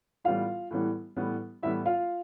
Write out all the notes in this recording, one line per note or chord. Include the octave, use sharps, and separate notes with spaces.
A2 E3 G3 B3 F4 F5
A2 E3 G3 B3
A2 E3 G3 B3
A2 E3 G3 B3 E4 E5
F4 F5